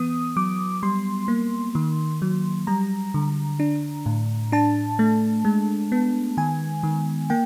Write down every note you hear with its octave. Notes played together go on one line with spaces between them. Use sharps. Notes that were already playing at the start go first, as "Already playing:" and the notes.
Already playing: E3 B3 D#6
F#3 D6
G3 C6
A#3
D#3
F#3
G3 A#5
D3
D4
A2
D4 A5
A3
G#3
B3
D#3 G#5
D#3
A#3 G5